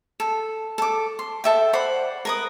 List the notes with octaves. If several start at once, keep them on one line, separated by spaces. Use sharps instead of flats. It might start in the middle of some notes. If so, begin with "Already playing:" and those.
A4
A4 D6
C6
A4 E5 G5
C5 D5 F#5 B5
A#4 B4 D#6